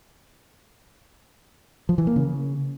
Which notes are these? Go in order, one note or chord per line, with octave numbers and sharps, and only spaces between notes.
F3
E3
A#3
C#3